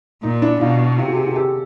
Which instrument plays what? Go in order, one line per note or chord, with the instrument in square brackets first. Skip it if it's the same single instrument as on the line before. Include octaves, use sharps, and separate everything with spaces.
[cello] A#2 [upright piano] D#4
[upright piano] D4 E4
[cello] B2 [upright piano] D#4 F4
[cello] C3 [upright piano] F4 G4
[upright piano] F#4 G#4
G4 A4
F#4 G#4
G4 A4